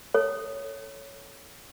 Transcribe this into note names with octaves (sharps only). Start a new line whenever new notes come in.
A4 C#5